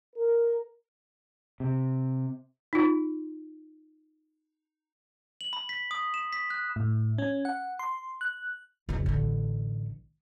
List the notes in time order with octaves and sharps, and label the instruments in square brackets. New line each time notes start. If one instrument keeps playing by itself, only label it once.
[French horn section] A#4
[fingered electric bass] C3
[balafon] D#4 F4
[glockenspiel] F#7
B5
B6
D#6
E7
B6
F#6
[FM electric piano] A2
C#4
F#5
C6
F#6
[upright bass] F2 C#3
A1 D3